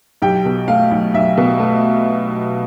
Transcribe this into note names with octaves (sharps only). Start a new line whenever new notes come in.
B1 G4 G5
B2
A3 F5
B1
B1 E5
B2
A3